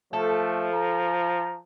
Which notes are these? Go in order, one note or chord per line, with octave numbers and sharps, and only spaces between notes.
F3 A3 A4
A#5